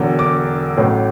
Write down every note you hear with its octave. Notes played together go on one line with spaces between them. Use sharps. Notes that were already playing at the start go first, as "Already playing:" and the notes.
Already playing: E1 E2 D3 F#3
D6
A1 A2 F#3 A3